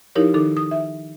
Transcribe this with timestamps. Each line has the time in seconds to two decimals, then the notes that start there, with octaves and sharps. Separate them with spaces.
0.15 F3 D#4 E4 G4 A#4 C#5
0.34 D#3 D#4 A4 D6
0.57 D#6
0.71 E5